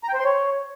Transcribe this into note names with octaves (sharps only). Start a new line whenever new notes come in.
A#5
G5
C5
C6
C#5